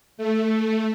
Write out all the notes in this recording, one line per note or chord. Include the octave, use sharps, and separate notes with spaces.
A3